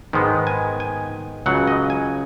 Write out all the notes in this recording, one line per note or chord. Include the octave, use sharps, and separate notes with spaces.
G#2 D#3 G#3 B3
G#5
G#5
C#2 C#3 F#3 F#5
D#5
G#5